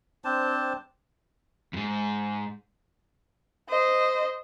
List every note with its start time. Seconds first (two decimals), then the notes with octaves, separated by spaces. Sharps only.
0.25 C4 D4 C5 A5
1.73 F2 G#2
3.69 C5 D#5